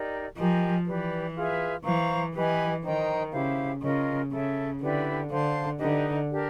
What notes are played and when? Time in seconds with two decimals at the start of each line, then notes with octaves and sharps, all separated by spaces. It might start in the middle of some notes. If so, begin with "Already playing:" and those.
Already playing: D#4 G4 A#4 D5
0.37 F3 G4 A#4 D#5 G#5
0.86 E3 G4 B4 D5
1.35 F4 G#4 B4 E5
1.84 E3 C5 F5 A#5 C#6
2.34 E3 G4 B4 D#5 G#5
2.83 D#3 C5 D#5 G5 A#5
3.32 C#3 E4 G4 C5 F5
3.81 C#3 C#4 F4 A#4 D#5
4.31 C#3 A4 C#5 E5
4.80 D3 E4 G4 B4 D5
5.30 D3 C5 F5 A5 C6
5.79 D3 D#4 G4 B4 D#5
6.29 D4 G4 A#4